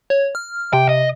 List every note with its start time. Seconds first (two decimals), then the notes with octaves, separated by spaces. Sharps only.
0.10 C#5
0.35 F6
0.73 C3 G5
0.89 D#5